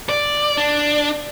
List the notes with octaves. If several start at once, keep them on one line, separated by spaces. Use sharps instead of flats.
D5
D4